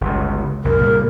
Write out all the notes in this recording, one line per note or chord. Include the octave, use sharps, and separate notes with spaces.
G1 C#2
C2 F#2 A#4
A#2 C#3 G3